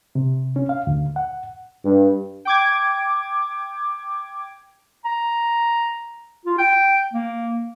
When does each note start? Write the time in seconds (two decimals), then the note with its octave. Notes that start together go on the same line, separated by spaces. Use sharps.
0.15 C3
0.56 C#4
0.69 F5
0.87 D2
1.16 F#5
1.84 G2
2.45 G5 D6 G#6
5.05 A#5
6.46 F4
6.58 G5
7.13 A#3